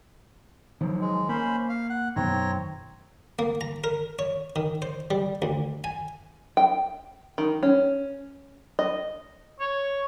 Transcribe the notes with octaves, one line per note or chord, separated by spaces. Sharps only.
D#3 F3 F#3
G#3
A#3 C#4 C5 B5
F5
F#5
F#2 B2 D#3 C4 C#5 A#5
A#3
A#5
A#4
C#5
D#3
C5
G3
D2
G#5
G5
D#3
C#4
D#5
C#5